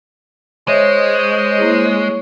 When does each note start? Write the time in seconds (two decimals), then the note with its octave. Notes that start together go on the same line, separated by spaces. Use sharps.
0.68 G#3 C5 C#5 D#5 E5
1.58 A#3 E4 G#4